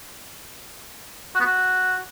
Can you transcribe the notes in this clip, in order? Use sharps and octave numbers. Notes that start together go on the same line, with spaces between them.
F#4
B3
F#4